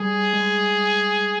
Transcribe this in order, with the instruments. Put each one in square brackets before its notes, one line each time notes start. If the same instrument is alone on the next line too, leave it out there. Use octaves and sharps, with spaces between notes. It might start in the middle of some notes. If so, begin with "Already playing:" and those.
Already playing: [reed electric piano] G3 [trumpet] G#4
[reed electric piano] G#3